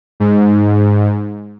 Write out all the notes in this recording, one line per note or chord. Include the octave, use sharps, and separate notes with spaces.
G#2